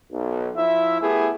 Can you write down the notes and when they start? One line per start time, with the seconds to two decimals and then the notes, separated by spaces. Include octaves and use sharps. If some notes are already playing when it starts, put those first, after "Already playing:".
0.12 B1
0.55 F3 E4 E5
1.01 A3 B3 E4 G4 G#4